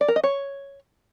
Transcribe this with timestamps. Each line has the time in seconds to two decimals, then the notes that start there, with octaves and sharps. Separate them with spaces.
0.01 D5
0.08 A#4
0.16 D#5
0.24 C#5